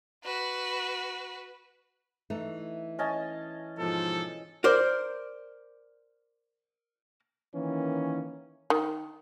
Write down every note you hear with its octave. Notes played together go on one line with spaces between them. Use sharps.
F#4 B4
E3 A3 D#4
C#4 D#5 A5
G#2 B2 F3 A4
A#4 C5 D5
D#3 E3 A#3 C#4
D#3